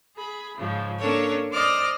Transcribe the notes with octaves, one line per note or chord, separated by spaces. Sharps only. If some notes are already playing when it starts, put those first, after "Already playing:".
G#4 B5
G#2 C#3 F3
A#3 C#4 D4 A4 A#4 C#5
C5 D5 D#5 D6 F6